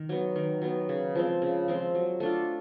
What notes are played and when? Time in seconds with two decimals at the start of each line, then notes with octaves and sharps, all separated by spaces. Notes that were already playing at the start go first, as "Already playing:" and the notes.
Already playing: D#3
0.09 F#3 B3
0.36 D#3
0.62 F#3 B3
0.89 C#3
1.15 F3 G#3 C4
1.42 C#3
1.68 F3 G#3 C4
1.95 F#3
2.20 A3 D4 F4